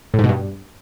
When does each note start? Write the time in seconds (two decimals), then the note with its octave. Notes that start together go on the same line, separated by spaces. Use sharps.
0.14 A2
0.19 G#2
0.24 B2
0.29 G2